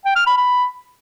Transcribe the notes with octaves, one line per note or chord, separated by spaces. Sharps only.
G5
F6
B5
B5